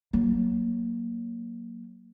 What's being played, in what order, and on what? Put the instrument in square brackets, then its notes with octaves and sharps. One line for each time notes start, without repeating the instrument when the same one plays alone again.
[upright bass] F#3 A#3